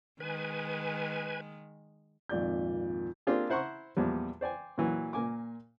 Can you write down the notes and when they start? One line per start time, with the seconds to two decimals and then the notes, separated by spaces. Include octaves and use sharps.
0.20 D#3 G#3 B4 G#5
2.29 G#1 F2 A#2 D5 G6
3.27 A#3 C4 D4 F4 G4 G#4
3.50 E4 C5 F#5 A#5 C6 C#6
3.97 E2 A#2 F3 G3
4.41 C5 D5 G5 G#5
4.78 A#2 E3 F#3
5.13 A#2 A#4 G#5 D6